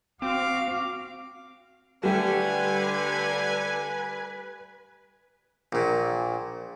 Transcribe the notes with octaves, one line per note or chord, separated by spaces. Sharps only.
C4 F#4 F5 D6
D3 G3 A3 G4 B4 G#5
A#1 A#2